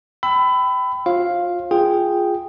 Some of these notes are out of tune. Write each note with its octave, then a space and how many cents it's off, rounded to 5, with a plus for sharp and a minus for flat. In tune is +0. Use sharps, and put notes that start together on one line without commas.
G5 -15 B5 +25 E6 +0
F4 +20 C5 +45 F5 +0
F4 +0 G#4 -5 G5 +0